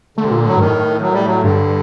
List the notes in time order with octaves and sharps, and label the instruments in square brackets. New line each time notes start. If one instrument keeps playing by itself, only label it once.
[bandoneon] D3 [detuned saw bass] A3
[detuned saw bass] C3
A#2
[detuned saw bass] A2 [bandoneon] F#3
[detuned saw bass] G2 [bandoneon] D#3
[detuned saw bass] A2
[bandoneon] F#3
G3
F#3
[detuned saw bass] G2 [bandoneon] D3